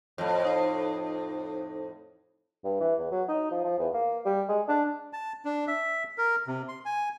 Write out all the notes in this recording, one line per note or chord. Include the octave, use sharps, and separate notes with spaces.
F2 A2
D#4 C5
G2
E3
E2
F#3
D#4
F3
F3
E2
A#3
G3
G#3
D4
A5
D4
E5
A#4
C3
C6
G#5